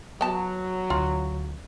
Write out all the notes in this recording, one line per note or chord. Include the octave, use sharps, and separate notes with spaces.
F#3 B3 A5
D2 F4